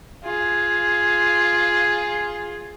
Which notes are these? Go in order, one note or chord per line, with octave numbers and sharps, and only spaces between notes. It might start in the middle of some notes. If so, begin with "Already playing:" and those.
F4 G#4